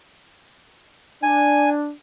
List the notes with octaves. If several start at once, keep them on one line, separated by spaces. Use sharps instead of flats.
D4 G#5